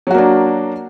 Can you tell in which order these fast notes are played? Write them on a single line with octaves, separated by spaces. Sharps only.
F#3 F#4 A#3 D4